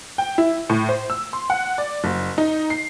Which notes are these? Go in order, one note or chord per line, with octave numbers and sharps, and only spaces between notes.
G5
E4
A2
C5
E6
C6
F#5
D5
F#1
D#4
C7